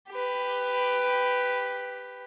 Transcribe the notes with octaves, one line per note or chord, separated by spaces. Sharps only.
G4 B4